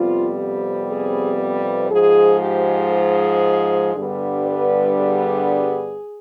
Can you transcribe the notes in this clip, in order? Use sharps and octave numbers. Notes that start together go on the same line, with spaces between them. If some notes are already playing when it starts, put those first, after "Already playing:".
Already playing: F2 C3 G3 B3 F4
G4
G#4
B4
G#2 F3 G#3 G#4
G4
G#4
G2 D3 G3 B3
B4
G#4